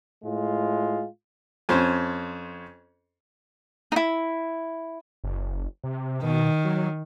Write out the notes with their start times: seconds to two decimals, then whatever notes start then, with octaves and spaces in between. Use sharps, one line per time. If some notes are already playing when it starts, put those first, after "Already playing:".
0.22 A2 G#3 F4
1.69 F2 C#4 C5
3.92 D#4 E4
5.24 F#1
5.84 C3
6.23 B2 D#3
6.65 F#3